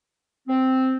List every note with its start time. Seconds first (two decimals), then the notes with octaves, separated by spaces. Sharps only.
0.48 C4